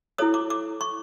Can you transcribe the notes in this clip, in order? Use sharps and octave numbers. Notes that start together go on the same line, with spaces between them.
E4 A4 C#5 D#6
D6
D6
C#6